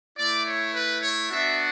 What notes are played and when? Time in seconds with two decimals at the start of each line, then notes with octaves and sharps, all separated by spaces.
0.17 A3 E4 D5
0.46 C#5
0.74 B4
1.02 C#5
1.30 B3 D4 F#4 E5